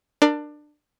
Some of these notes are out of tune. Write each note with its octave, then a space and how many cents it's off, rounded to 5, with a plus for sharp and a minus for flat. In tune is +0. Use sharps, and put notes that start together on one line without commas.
D4 +20 A#4 -5